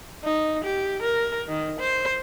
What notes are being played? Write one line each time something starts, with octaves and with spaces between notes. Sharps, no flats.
D#4
G4
A#4
D#3
C5